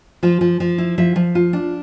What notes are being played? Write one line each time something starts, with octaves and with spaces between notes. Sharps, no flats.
F3 F4
F3
F3
E4
F3 E5
F3
F4
D4